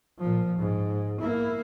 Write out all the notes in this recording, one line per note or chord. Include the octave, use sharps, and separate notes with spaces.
A#2 F3
G#2
A#3 E4